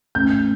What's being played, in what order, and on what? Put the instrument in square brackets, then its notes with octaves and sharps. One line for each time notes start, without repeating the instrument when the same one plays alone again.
[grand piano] A1 G6